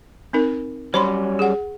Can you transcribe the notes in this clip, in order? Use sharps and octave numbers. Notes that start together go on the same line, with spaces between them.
C4 D#4 A#4
F#3 G3 C#4 C5 B5 C6
G#4 F#5